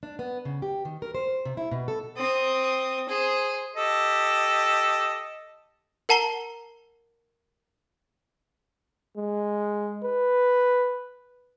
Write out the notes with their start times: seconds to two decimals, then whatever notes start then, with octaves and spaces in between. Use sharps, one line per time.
0.03 D4
0.19 B3
0.45 C#3
0.62 G4
0.85 D#3
1.02 A#4
1.15 C5
1.45 C3
1.57 E4
1.71 B2
1.88 A4
2.17 C4 D#6
3.08 G#4 C5
3.76 G4 A4 D#5
6.09 A#4 F#5 A5 A#5 C7 G7
9.17 G#3
10.04 B4